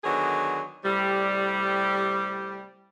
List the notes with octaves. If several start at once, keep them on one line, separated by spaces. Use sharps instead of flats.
D3 D#3 F#3 B3 G#4
A2 C3 G3